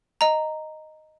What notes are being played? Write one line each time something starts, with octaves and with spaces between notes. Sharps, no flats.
D#5 A#5